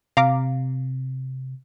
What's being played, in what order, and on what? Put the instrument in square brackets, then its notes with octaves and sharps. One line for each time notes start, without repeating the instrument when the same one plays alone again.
[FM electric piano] C3 [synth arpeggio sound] F5 A#5 D6